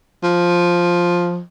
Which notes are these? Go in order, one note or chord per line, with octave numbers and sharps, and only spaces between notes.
F3